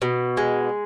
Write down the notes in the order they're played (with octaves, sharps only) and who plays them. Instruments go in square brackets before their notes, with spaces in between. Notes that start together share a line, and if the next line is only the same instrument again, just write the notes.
[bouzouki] B2
G#3